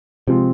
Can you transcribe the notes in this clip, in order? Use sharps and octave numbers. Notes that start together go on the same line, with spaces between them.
C3 F3 G#3 C4 F4